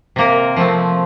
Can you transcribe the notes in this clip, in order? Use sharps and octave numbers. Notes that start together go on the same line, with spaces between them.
C3 A#3 A#4
F3 A3 C4